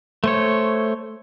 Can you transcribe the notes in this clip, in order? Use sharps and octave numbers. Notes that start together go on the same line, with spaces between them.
A3 C5 C#5